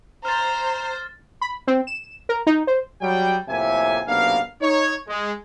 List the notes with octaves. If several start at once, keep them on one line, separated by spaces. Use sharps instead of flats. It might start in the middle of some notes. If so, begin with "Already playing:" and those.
C5 A#5 F6 A6
B5
C4
E7
A#4
D#4
C5
F#3 G3 G5
F2 A2 C3 A#3 E5 G#5
B1 C3 A#3 B3 D4 F5
D#4 C#5
G#3